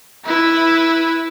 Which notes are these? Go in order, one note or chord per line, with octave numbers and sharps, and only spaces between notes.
E4 B4